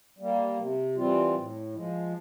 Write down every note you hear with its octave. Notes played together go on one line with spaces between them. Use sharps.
G3 A#3
C3
E3 G3 C4 F4
A2
F3 G#3